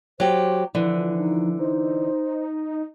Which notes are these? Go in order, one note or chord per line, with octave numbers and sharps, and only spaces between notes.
F#3 G4 C5
D3 E3 F3 E4
D#4
D#4 C5